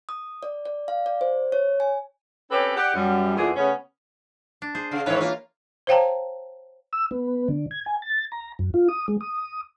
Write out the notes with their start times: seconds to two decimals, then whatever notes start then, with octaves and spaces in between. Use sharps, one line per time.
0.09 D#6
0.43 D5
0.65 D5
0.88 F5
1.06 D5
1.21 C5
1.52 C#5
1.80 G#5
2.51 C4 C#4 G4 A4 B4 C#5
2.77 G4 D5 F#5
2.94 F#2 G3
3.36 E2 A#2 D3 E3 G#4
3.55 C#3 A3 B3 C#4
4.62 D4
4.75 G#4 C5
4.91 C#3 F5
5.06 G#2 D#3 E3 G#3 B4 C#5
5.21 A#3 F4
5.87 C5 C#5 F5 G5 A5 A#5
6.93 E6
7.11 B3
7.48 D3
7.71 G#6
7.86 G#5
8.02 A6
8.32 A#5
8.59 F#2
8.74 F4
8.89 D#6
9.08 G#3
9.21 D#6